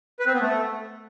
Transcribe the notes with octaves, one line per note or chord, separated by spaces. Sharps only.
B4
C4
B3
A3